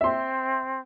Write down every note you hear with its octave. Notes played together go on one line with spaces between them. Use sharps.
C4 E5 C6